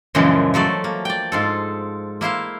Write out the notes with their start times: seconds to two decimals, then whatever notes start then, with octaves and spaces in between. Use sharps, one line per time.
0.15 F#2 A#2 C#3 E3 F3 G#3
0.54 F3 F#3 A3 D5
0.84 A#3
1.05 D5 G5
1.32 G#2 F4 A4
2.21 A#3 E4 C5 F5